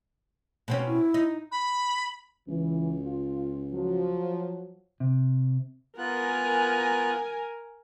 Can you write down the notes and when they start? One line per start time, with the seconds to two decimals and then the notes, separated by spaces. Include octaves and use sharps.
0.68 B2 C4 C#4
0.86 E4
1.14 D#4
1.51 B5
2.48 C#2 E3
3.00 F4
3.72 F3 F#3
5.00 C3
5.98 B3 F4 A#4 G#5 F#6